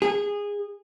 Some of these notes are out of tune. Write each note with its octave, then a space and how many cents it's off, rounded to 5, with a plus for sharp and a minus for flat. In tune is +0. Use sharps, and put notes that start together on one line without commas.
G#4 -20